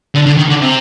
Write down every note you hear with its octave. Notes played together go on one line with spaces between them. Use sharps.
D3
D3
D#3
D3
C3